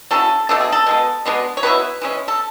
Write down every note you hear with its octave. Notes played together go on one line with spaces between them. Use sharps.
F#3 C#4 E4 A4
B2 A3 D4 A4
G#4
A4
B2 G#3 B3
B2 G#3 B3 D4
C#5
B2 F#3 B3 E4 B4
E3 G#3 C#4
A4